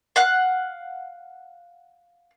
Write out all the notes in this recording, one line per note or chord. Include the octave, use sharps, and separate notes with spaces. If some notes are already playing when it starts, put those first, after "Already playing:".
F5 F#5 F#6